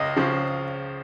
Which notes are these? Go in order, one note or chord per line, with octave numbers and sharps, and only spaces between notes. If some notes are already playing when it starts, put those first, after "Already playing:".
Already playing: C#2 D#5
C#3 F3